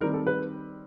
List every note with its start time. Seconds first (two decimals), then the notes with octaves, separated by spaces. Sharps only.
0.01 D#3 G3 C4 A#4
0.14 A4
0.27 B4